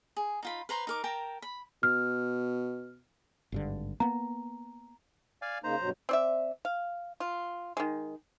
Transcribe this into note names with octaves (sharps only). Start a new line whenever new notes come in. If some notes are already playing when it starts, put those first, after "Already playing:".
G#4
D#4 F4 B5
B4 C5 A#5 C6
D#4 A#4 D6
A#4 G5 A5 A#5
B5
B2 F6
G#1 G2 D3
A#3 B3 A#5
D5 F5 G#5
C#3 A#3 D#4 C5 A#5
G2 B2 F#3
C4 D5 E5
F5
F4
D#3 G#3